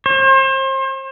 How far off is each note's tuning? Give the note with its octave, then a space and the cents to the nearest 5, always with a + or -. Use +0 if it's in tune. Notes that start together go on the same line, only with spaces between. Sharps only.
C5 +35